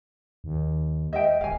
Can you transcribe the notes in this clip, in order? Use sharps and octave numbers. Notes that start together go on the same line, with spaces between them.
D#2
D#5 E5 G5
D1 F5 G#5